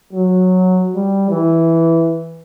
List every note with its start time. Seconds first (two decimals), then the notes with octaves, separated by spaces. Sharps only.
0.13 F#3
0.95 G3
1.30 E3